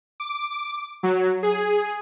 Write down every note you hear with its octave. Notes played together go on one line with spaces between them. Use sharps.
D6
F#3
G#4